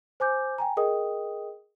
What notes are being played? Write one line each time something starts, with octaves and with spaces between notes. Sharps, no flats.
C5 G#5 D6 G6
G5 G#5 A#5
G#4 A#4 D#5 G5 D#6